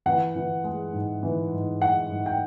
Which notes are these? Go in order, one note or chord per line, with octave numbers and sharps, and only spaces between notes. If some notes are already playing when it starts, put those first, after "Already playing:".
E3 F#5
E3
G#3
G#2
E3
G#2
G#2 F#5
G#2
G5